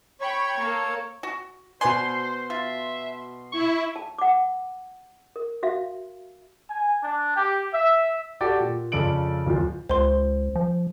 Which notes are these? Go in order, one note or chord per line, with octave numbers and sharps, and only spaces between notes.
C#5 G5 B5 C#6
A#3 A4
F#4
B2 B4 C5 D5 G#5 C6
F4 E5
E4 C#6
A5
F#5 D6
A#4
F#4 E5 F5
G#5
D4
G4
E5
F#4 G4 A4 D5 G5
A#2
F2 C#3 A4 D5 D7 F#7
D1 F2 F3
C#2 C5 C6
F3